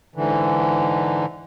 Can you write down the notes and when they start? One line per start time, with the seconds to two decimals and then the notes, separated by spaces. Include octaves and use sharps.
0.16 G#2 D3 E3